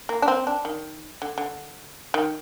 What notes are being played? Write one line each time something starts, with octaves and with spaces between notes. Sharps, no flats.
A#3
D4
C4
D4
D#3
D3
D3
D#3